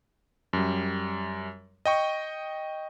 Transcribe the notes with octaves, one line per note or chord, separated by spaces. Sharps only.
F#2 G3
D#5 G5 C#6